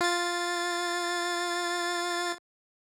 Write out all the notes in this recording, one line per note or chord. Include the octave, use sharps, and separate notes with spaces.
F4 A6